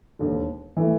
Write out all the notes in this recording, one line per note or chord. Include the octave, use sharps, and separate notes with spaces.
E1 D#2 D3
E3 A3